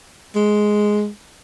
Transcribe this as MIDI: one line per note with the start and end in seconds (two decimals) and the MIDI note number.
0.35 1.08 56